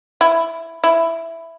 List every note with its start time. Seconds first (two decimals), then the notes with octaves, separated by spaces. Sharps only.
0.21 E4
0.84 E4